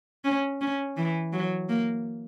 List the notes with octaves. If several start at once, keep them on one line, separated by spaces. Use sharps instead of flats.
C#4
C#4
E3
F#3
A#3